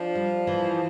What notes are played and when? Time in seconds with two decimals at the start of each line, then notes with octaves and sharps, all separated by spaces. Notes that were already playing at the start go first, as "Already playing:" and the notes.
Already playing: F3 D4
0.15 G3
0.47 E3